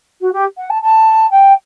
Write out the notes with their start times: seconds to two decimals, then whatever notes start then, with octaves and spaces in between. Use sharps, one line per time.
0.21 F#4
0.33 G4
0.58 F#5
0.70 A5
0.83 A5
1.31 G5